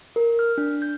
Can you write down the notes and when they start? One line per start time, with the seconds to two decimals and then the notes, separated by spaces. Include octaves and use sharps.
0.16 A#4
0.39 F6
0.58 D4
0.82 G6